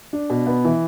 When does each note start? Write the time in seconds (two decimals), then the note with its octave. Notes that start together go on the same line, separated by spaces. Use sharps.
0.13 D4
0.30 B2
0.47 B3
0.65 E3